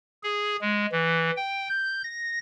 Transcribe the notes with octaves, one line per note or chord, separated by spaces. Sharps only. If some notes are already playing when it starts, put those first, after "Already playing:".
G#4
G#3
E3
G5
G6
A#6